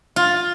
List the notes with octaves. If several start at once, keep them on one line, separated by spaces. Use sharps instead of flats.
F4